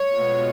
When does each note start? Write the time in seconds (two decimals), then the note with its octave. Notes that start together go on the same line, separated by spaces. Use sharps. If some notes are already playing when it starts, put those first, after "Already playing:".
Already playing: C#5
0.13 B2 G#3 B3 F4